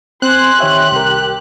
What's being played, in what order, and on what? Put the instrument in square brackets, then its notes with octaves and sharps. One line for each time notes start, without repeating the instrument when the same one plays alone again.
[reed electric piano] C4 [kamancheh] C5 G#5 [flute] C6 [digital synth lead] F#6
[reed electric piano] D#3 C#5 E5 [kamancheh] G4
[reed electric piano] C2 A#4